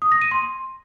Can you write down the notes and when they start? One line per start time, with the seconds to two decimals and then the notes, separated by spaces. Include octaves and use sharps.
0.02 D#6
0.12 A#6
0.22 D#7
0.31 C6